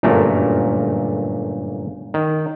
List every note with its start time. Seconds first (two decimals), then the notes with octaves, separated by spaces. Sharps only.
0.03 G1 F#2 A#2 A3 A#4
2.14 D#3